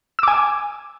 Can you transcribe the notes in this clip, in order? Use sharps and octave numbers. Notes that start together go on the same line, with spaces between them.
G#5 D6 E6